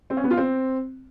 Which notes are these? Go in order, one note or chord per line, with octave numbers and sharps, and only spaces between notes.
C4
C#4
B3
F4
C4